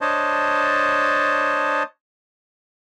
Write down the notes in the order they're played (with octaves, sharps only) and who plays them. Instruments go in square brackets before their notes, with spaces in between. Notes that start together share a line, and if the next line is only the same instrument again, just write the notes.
[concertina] D4 C5 C#5 D#5 A5